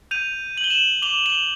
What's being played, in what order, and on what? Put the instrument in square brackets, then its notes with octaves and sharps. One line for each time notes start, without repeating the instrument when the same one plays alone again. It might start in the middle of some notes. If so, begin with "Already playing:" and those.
[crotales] G6 D#7 F7
G6 F#7
G7
E7 F#7
D6 F7 G7
F7 G7